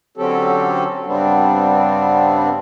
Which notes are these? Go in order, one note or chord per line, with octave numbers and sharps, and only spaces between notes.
D3 F#3 C4 C#4 G4 A4
G2 C#3 G3 B3 C4 D4